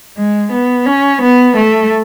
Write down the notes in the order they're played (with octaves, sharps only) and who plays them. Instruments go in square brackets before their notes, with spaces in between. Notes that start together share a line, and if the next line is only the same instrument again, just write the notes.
[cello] G#3
B3
C#4
B3
A3